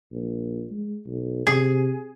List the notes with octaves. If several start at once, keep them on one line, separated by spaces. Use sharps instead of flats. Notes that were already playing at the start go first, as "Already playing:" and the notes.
A#1
G#3
B1
C3 G#4